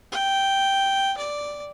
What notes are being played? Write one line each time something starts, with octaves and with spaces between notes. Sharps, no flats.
G5
D5